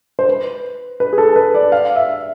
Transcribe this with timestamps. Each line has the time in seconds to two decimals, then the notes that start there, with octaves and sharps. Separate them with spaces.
0.19 C5
0.29 B4
1.00 B4
1.13 G#4
1.18 A4
1.36 B4
1.54 D5
1.72 F5
1.96 E5